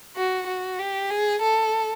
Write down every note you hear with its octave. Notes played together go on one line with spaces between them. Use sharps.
F#4
F#4
G4
G#4
A4